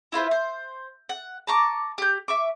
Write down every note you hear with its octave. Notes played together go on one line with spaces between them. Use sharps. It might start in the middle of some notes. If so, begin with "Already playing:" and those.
E4 F4 B4 C5
C5
F#5
A5 A#5 C#6 D6
G4 G6
E5 C#6 D6